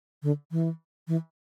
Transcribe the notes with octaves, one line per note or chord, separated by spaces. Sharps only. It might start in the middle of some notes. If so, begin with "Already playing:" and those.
D3
E3
E3